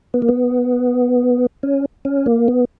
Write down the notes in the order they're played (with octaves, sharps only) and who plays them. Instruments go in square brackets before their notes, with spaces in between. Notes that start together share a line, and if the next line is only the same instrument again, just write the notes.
[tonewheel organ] B3
A#3
B3
C#4
C#4
A#3
B3